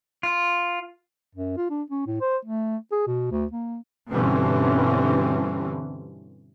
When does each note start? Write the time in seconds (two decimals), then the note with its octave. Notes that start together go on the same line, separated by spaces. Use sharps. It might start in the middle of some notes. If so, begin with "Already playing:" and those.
0.23 F4
1.35 F#2
1.57 F4
1.70 D4
1.90 C#4
2.07 A2
2.21 C5
2.45 A3
2.92 G#4
3.07 B2
3.31 D2
3.51 A#3
4.11 G2 B2 D3 E3 C4 C#4